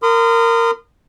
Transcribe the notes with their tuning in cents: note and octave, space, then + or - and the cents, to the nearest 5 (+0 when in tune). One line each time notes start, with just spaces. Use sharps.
A#4 -15 C6 -45 D#6 -30